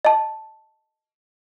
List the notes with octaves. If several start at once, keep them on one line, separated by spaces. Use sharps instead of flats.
D#5 A5